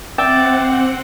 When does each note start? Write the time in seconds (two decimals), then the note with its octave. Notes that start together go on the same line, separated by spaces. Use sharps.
0.18 C4 D5 E5 F#5 G5